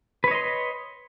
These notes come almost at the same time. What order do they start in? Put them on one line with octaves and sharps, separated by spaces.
B4 C#5 D#5 C6